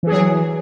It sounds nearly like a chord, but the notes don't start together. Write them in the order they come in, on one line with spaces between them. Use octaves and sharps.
E3 G#4 F#3